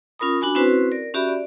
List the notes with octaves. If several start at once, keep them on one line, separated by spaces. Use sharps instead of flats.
C#4 F4 A#4 B5 D#6
D4 F#4 G#5 B5
C4 C#4 E4 F#4 B4 C5
A#4 D5
C#4 F#4 G4 D5 E5 B5
D5